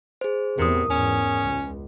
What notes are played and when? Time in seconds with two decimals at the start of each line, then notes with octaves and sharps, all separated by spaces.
0.21 G#4 C5
0.59 E2 A2 C3 A#4 D#6
0.90 E2 G#2 C#4
1.43 C#2